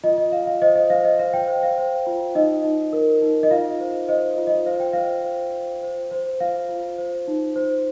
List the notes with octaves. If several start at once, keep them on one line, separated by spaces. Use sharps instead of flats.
F4 D#5
D#5
F4 F5
F5
C5 D#5
D#5
C5 F5
D#5
C5 F5
G5
C5
F5
C5
F4
D#4 D#5
D#4
A#4
D#4
D#5
F4 F5
C5
C5 D#5
F4
D#5
C5 F5
G5
C5 F5
C5
C5
C5
C5
F4 F5
F4
C5
D#4
C5